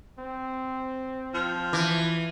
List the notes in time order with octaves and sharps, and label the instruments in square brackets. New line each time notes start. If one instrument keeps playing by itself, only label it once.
[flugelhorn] C4
[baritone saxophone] F3
[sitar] E3